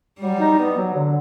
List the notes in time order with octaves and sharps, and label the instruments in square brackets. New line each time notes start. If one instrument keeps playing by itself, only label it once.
[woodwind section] F#3 [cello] G3
[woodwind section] D#4
B3
F#3
D3